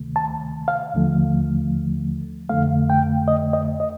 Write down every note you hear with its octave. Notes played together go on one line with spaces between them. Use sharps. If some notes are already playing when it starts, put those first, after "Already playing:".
Already playing: D2 C3 D#3 A3
A5
F5
D#2 D3 F3 A3
F2 D3 A3 F5
G5
D#5
D#5
D#5